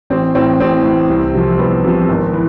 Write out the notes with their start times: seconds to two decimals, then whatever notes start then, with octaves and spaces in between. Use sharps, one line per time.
0.10 A1 C4
0.35 A2 E3 C4
0.60 A1 C4
0.85 A2 E3
1.09 C2
1.34 C3 F3
1.59 C2 B3
1.84 C3 F3
2.09 G#1
2.33 E3